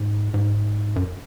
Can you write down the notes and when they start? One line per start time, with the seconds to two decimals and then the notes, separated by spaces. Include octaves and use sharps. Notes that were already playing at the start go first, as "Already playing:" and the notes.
Already playing: G#2
0.34 G#2
0.96 F#2